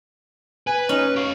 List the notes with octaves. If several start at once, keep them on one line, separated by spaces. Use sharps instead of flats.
B4 G#5
C#4 D#4
G4 F5 C#6